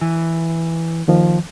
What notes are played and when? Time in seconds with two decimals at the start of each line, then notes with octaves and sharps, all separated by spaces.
0.01 E3
1.08 D#2 D#3 F3